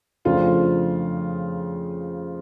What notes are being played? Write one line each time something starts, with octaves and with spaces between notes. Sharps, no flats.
F2 C#3 F3 A3 D4 F4